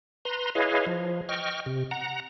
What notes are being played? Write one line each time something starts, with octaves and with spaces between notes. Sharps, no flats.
B4 A#5 C6
E4 G#4 B4 C#5 D#5 F5
F3
D#5 G5 C#6 F6
C3
F#5 A#5